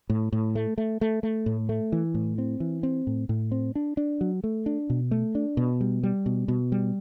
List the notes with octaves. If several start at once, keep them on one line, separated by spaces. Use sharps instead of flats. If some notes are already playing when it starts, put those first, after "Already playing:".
A2
A2
A3
A3
A3
A3
A2
A3
E3
A2
C4
E3
C4
A2
A2
C4
D4
D4
F#3
A3
D4
B2
A3
D4
B2
G3
G3
B2
B2
G3